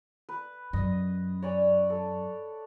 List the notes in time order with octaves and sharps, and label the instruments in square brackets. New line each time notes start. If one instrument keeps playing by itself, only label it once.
[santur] B4
[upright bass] F#2 [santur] D#5
[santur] C#5 D5 G#5
A4